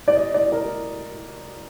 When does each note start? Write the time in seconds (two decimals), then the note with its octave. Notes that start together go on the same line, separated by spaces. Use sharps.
0.08 D5
0.16 D#5
0.34 D5
0.52 A#4